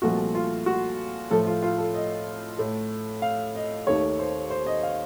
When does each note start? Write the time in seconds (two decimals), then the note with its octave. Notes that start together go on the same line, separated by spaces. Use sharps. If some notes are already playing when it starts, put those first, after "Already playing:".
0.02 C2 A#2 F3 A3 F#4
0.35 F4
0.66 F#4
1.31 A2 F3 A3 A4
1.46 F4
1.62 F4
1.78 A4
1.94 D#5
2.59 A2 A3
3.22 F5
3.55 D#5
3.87 D#2 D#3 A3 C#5
4.19 C5
4.50 C5
4.67 D#5
4.83 F5